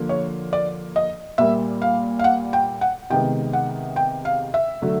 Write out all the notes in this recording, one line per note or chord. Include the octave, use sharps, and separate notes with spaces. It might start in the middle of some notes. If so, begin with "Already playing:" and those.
Already playing: D3 F3 A#3
C#5
D5
D#5
A#2 G3 A#3 E5
F5
F5
F#5
G5
F#5
C3 D#3 G#3 B3 G5
F#5
G5
F5
E5
D3 F#3 A3